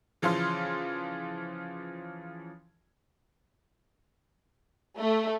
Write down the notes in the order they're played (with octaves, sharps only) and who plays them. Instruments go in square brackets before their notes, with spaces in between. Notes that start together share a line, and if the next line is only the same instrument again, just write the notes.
[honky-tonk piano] C#3 E3 F3 F4 C6 F6
[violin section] A3